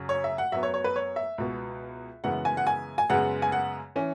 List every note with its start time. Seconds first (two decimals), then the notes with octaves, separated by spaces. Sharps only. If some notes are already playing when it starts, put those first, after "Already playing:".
Already playing: F#2 C#3 F#3
0.09 C#5
0.24 E5
0.38 F#5
0.52 F#2 F#3 B3 E5
0.63 C#5
0.74 C#5
0.84 B4
0.96 C#5
1.16 E5
1.38 C#2 B2 B3
2.24 F#2 C#3 E3 G#3 B3 F#5
2.45 G#5
2.57 F#5
2.67 G#5
2.98 G#5
3.10 F#2 C#3 G#3 B3 F#5
3.42 G#5
3.52 F#5
3.96 E3 C#4